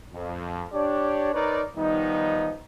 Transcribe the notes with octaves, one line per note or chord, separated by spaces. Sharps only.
F2
D4 G4 C#5 D5
D#4 A#4 B4 C#5 D5
D#3 F3 G3 B3 D#4